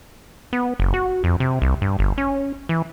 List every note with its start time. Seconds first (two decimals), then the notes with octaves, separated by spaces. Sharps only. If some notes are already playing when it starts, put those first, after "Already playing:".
0.53 B3
0.80 F#1
0.94 F#4
1.24 F2
1.40 C3
1.62 C2
1.82 G2
1.99 G1
2.18 C#4
2.69 E3